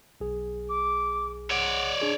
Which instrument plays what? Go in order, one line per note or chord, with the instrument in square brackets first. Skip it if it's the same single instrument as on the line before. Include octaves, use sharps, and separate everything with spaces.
[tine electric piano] B1 G#4
[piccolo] D6
[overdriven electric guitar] C#5 D5 [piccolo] F#5
[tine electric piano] D4 G#4